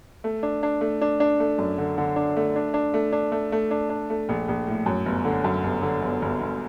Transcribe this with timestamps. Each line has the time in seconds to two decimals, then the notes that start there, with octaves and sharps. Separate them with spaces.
0.24 A3
0.43 D4
0.63 D4
0.81 A3
1.01 D4
1.20 D4
1.40 A3
1.59 F#2
1.78 D3
1.98 D3
2.16 D4
2.36 A3
2.56 D4
2.74 D4
2.94 A3
3.12 D4
3.32 A3
3.52 A3
3.71 D4
3.90 D4
4.10 A3
4.29 A#1
4.48 A#1
4.67 A2
4.86 F#2
5.06 G1
5.25 D3
5.44 F#2
5.63 G1
5.82 D3
6.02 G1
6.22 G1
6.41 G1